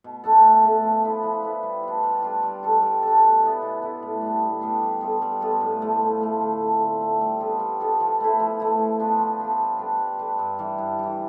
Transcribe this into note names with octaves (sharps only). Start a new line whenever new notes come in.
B2
A3 D4 A4
B2
A3 D4 A4
F3
B3 E4 B4
F3
B3 E4 B4
G3
D4 F4
G3
D4 F4
G3
D4 A4
G3
D4 A4
B2
B3 E4
B2
B3 E4
A2
G3 B3 D4
A2
G3 B3 D4
G3
B3 F4 A4
G3
B3 F4 A4
A2
F3 A3
A2
F3 A3
D3
A3 C4
D3
A3 C4
G3
B3 F4 A4
G3
B3 F4 A4
F3
A3 E4
F3
A3 E4
F3
B3 D4 F4
F3
B3 D4 F4
G3
D4 G4 B4
G3
D4 G4 B4
G2
E3 G3
G2
E3 G3